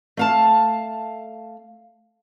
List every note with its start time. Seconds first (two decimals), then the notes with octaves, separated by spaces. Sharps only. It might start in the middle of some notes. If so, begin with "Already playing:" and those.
0.17 A3 F5 A5